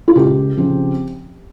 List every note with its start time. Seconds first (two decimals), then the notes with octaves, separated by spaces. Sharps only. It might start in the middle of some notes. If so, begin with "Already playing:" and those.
0.08 F4
0.15 C#2 G4
0.57 C#3 F3 C4